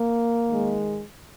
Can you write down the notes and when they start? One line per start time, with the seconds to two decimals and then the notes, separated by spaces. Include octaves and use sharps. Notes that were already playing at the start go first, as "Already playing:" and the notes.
Already playing: A#3
0.47 D#3 G#3